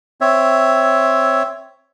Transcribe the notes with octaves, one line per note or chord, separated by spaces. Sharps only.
C4 C#5 E5